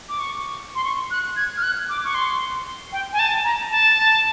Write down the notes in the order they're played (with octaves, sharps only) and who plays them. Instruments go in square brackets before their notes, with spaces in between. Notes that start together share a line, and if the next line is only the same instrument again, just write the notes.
[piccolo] D6
C#6
C6
C#6
F#6
G#6
F6
F#6
D6
C#6
C6
G5
G#5
A5
A#5
A5